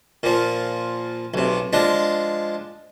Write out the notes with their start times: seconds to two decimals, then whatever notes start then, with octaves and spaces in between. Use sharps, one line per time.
0.23 A#2 F3
1.34 B1 C3
1.73 F3 G#3 D4